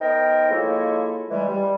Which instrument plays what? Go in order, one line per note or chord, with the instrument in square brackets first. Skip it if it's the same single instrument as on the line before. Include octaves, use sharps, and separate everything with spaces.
[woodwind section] B3 D#4 A#4 C5 G5
F3 G#3 A#3 E4 A4 C#5
E3 G3 G#3
G3